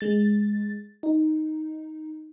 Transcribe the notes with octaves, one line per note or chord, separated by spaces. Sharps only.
G#3 A6
D#4